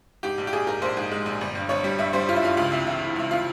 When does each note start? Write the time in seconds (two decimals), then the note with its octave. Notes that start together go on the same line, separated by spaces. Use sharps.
0.23 G#2 G4
0.38 A#1
0.47 G4
0.52 A#1 G#4
0.67 G#2 A#4
0.82 A#1 C5
0.97 G#2
1.12 G#3
1.26 A#1
1.41 G1
1.55 G2
1.69 G1 C#5
1.84 G3
1.98 G2 E5
2.13 G3 C5
2.29 G2 F4
2.36 E4
2.43 G2 F4
2.57 C#2 F4
2.72 C3 E4
2.87 E3 E4
3.02 E3
3.16 C#2 E4
3.31 C3 F4